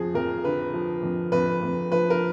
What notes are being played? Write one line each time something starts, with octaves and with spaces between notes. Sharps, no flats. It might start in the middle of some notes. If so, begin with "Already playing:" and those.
Already playing: F2 F3 G#4
F2 A#4
D3 B4
F3
F2
F2 B4
F2
F3 B4
A#4